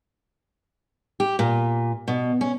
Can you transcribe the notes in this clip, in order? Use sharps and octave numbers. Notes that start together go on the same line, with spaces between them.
G4
A#2
B2
C#4